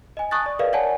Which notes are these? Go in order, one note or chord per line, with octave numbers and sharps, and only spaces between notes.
D#5 G#5
A5 C#6 D#6 F#6 A6
D5
G#4 A#4 B4 D5 D#5 F5
C#5 D5 F#5 G#5 A5